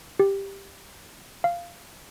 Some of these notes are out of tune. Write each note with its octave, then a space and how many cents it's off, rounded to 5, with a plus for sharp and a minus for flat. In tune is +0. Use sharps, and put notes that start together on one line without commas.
G4 +5
F5 -10